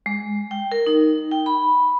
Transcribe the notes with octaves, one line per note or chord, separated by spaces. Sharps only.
G#3
G5
A#4
D#4
G5
B5